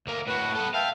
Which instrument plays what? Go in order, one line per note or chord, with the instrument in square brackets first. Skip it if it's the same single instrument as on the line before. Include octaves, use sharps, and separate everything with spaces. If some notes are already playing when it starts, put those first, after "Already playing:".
[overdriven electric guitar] D2 A#4 [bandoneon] A#3
[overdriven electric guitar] A2 F#4 [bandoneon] B4
[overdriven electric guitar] B3 A4
[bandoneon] E5 G5 A5 [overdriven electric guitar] F5